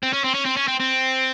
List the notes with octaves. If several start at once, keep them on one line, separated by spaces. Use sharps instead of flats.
C4
C#4
C4
C#4
C4
C#4
C4
C4